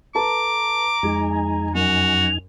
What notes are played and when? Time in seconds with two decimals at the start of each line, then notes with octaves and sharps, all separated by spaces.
0.15 A4 B4 A5 A#5 D6
1.03 F2 G#3 D#4 G#5
1.75 F#2 F#4 F7